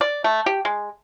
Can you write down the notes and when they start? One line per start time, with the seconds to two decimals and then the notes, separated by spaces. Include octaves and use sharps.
0.01 D5
0.24 A3
0.46 G4
0.65 G#3